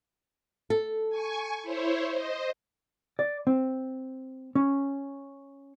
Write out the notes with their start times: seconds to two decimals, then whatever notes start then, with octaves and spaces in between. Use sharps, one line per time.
0.70 A4
1.10 G#5 C#6
1.62 E4 C5 C#5
2.11 C5 D#5
3.19 D5
3.47 C4
4.55 C#4